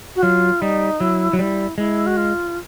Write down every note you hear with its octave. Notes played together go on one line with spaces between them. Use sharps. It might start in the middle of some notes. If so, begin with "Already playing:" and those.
F#4
F#3 F4
G3 D#4
F#3 E4
F#3
G3 E4
G#3 E4
F#4
F4